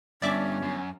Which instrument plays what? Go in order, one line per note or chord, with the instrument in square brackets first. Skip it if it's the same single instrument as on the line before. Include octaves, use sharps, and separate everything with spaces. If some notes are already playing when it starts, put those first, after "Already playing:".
[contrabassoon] G1 [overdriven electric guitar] G2 [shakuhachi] C#4 [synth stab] D5 E5 D6
[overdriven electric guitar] F#2